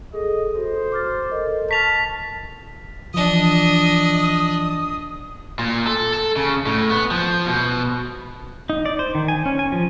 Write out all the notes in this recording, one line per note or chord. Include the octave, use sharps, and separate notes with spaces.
G#4 A4 D#5
F#4 A4 C5
D6 F6 A6
A4 A#4 D#5
A5 C#6 F6 B6 F7
E3 F3 D4 D#5 D#6
A#2
A4
A4
C#3
A2
B3
F3
B2
D#4
D5
C5
D#3
G#5
C#4
G#5
F3